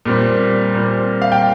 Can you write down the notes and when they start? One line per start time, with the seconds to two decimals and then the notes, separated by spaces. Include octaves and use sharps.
0.05 A#2 G3 C4
0.74 A#2 G3 C4
1.22 F5
1.32 G5